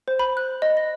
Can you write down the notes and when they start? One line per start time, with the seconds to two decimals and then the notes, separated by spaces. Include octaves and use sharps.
0.08 C5
0.19 B5
0.37 F#6
0.62 D#5
0.77 A#6